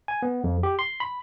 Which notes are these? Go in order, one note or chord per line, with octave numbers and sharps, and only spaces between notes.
G#5
B3
F2
G4
C6
B5